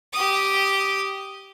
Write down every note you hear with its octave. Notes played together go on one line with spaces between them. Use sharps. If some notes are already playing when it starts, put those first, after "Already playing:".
G4 D#6